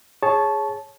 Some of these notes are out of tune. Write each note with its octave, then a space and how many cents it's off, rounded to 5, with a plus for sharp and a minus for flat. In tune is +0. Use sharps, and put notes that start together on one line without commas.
G#4 +0 C#5 +0 A5 -15